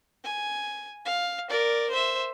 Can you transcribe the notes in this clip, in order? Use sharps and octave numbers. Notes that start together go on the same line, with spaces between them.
G#5
F5
A#4 D5
C5 E5